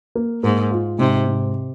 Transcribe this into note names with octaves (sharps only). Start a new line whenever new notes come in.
A#3
G#2 A#3
F4
G#2 C3
G#2